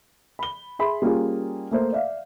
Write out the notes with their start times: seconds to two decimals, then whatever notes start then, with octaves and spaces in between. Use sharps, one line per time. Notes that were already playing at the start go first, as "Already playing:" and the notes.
0.39 B5 G7
0.79 G#4 E5 B5 C6
1.02 G3 A#3 C#4 F4 G#4
1.71 A3 A#3 C5
1.92 D5 E5 F5